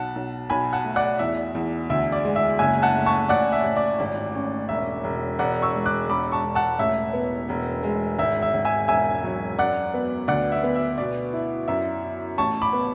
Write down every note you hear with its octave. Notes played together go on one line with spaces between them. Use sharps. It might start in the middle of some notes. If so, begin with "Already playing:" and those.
Already playing: B1 F#5 A5
B1
B1 G#5 B5
F#5 A5
A3
D5 F#5
E2 E5
E2
D2 E5
D5
G#3
E5
F#1 E5 G#5
F#5 A5
A3
A5 C#6
A1 D5 F#5
E5
A1
D5
G#1
C#4
E1 E5
E1
E1 D5 F#5
C#6 E6
G#3
D6 F#6
E1 B5 D6
A5 C#6
E1
F#5 A5
A1 E5
B3
E1
G#3
G#1 E5
E5
G#1
E5 G#5
E1 E5 G#5
F#3
F#2 D5 F#5
B3
D2 D5 F#5
E5
B3
E5
B2 D5
E4
F#2 E5
E4
A1 A5 C#6
B5 D6
B3